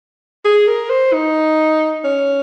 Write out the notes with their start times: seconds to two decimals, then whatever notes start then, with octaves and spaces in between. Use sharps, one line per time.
0.45 G#4
0.67 A#4
0.89 C5
1.13 D#4
2.04 C#4